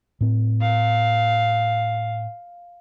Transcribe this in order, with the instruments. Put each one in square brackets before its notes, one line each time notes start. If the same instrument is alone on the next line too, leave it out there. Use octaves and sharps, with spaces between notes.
[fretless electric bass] A2 C4
[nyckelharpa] F5